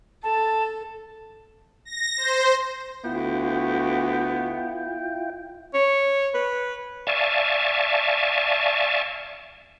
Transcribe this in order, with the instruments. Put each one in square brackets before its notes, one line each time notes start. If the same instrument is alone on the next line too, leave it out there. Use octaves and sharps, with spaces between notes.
[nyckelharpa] A4 [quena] A5
[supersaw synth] A#6
C5
[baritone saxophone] D2 [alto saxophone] B3 [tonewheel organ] E4 F4 G5
[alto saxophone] C#5
B4
[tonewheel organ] D5 E5 F5 G#5 A5 C#6